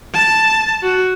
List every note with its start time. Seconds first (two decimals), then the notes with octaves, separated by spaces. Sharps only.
0.14 A5
0.83 F#4